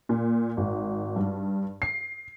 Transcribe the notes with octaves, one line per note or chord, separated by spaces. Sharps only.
A#2
G#1
G2
C7